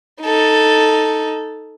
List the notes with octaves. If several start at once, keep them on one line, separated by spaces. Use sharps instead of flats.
D#4 A4